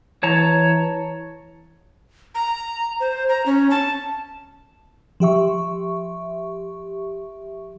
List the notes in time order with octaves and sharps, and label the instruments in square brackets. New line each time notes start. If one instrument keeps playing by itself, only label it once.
[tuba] E3 [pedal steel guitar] C#5 A5 A#5
[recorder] A#5
C5
A#5
C#4
A5
[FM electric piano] F3 G4 E5 C#6